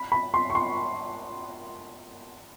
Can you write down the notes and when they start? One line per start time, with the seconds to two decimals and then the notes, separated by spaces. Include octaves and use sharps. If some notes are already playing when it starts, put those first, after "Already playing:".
Already playing: B5
0.12 B5
0.34 C6
0.50 C#6
0.55 C6